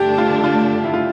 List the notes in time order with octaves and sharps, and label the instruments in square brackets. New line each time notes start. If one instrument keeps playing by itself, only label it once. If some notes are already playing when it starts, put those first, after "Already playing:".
Already playing: [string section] G2 D3 A3 D4 [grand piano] G4
[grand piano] F4
F4
E4
F4